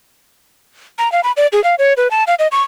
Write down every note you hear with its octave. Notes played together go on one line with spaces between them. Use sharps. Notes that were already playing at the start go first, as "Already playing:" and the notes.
A#5
F5
B5
D5
G#4
F5
C#5
B4
A5
F5
D#5
C#6